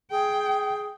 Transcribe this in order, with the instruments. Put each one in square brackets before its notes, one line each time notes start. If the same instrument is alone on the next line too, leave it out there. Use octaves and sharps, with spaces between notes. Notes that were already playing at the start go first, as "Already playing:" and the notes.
[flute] G#4 [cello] G5